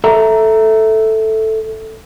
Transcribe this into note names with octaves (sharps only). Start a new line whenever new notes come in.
A4 E5 A#5